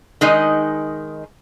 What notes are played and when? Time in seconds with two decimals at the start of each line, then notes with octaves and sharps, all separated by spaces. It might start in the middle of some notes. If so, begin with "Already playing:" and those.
0.21 D#3 G#3 D#4 D#5